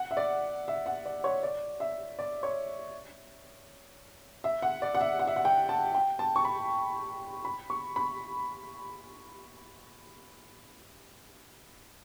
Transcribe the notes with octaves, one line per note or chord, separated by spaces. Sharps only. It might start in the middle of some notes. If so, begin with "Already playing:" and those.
Already playing: F#5
E5
D5
E5
F#5
D5
C#5
D5
E5
D5
C#5
E5
F#5
D5
F#5
E5
F#5
E5
F#5
G5
A5
G5
A5
C#6
B5
B5
C#6
B5